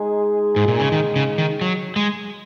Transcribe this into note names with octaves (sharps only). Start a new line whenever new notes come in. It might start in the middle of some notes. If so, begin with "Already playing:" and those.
Already playing: G#3 D#4 G#4
G#2
A#2
C#3
D#3
C#3
D#3
F#3
G#3